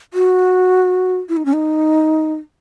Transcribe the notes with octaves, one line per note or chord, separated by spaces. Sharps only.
F#4
E4
D#4
C#4
D#4